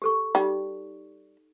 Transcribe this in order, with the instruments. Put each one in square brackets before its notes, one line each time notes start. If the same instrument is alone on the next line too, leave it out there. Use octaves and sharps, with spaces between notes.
[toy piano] G4 A4 C#6
[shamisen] G3 [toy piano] D#4